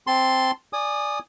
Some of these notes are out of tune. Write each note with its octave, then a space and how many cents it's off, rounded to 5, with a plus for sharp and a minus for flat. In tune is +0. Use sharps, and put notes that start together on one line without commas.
C4 +0 A5 +0 C6 +0
D5 +0 G#5 +0 D#6 -20